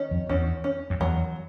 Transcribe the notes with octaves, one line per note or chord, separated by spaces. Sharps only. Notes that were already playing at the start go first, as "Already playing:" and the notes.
Already playing: D#3 C#4
F2
E2 C#4
C#4
F2
E2 F#3